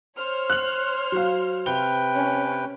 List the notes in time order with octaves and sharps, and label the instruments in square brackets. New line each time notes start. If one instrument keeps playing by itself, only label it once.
[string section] C5 C#5 F6
[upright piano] F#6 F#7
F#3 F5
[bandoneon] C3 B4 G5 [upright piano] G7
[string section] C#4